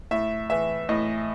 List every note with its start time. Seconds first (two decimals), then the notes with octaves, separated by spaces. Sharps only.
0.11 A2 E5
0.50 E3 E5
0.89 A2 D#5